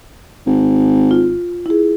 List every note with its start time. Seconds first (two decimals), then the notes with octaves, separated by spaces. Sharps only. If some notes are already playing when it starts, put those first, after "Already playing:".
0.46 G#1
1.11 F4
1.66 E4 G#4